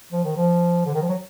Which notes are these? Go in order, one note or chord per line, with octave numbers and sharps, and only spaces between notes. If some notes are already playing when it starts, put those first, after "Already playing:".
F3
D#3
F3
D3
D#3
F3
F#3